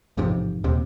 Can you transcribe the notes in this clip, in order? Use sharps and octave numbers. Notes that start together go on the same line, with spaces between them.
A1 F2 G#2 C3
D#1 D#2 C3